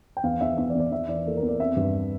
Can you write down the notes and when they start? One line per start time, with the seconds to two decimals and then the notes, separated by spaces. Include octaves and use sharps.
0.17 G5
0.23 E2 F5
0.41 E2 E5
0.58 E2 E5
0.70 D5
0.75 E2
0.80 D5
0.92 E2 E5
1.08 E3 D5
1.26 A#3 A4
1.37 A#4
1.42 E2
1.48 D5
1.60 C4 E5
1.76 G2